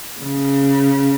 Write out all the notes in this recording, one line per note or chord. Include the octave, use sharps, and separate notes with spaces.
C#3